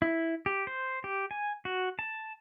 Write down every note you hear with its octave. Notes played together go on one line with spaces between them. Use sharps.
E4
G4
C5
G4
G#5
F#4
A5